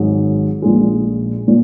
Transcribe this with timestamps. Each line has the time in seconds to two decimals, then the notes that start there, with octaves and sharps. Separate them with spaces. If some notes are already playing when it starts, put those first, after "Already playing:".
Already playing: G#1 G#2 D#3 F#3
0.62 A#1 A#2 G#3
1.48 A#2